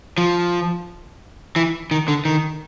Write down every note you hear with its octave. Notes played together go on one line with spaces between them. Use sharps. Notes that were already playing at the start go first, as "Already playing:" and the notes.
F3
E3
D#3
D3
D#3